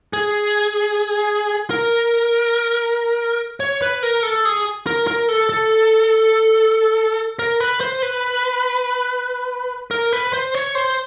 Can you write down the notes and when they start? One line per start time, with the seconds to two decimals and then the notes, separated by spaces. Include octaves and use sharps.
0.13 G#4
1.70 A#4
3.60 C#5
3.82 B4
4.03 A#4
4.23 A4
4.45 G#4
4.87 A#4
5.07 A#4
5.29 A4
5.49 A4
7.39 A#4
7.60 B4
7.80 C5
8.02 B4
9.91 A#4
10.13 B4
10.33 C5
10.54 C#5
10.75 C5